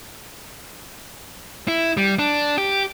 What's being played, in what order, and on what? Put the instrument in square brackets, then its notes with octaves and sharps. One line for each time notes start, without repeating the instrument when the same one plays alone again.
[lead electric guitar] E4
G3
D4
G4